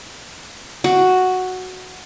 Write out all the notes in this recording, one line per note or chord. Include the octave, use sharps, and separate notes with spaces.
F#4